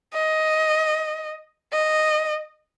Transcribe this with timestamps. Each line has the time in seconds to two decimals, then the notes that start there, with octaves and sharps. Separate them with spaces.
0.14 D#5
1.72 D#5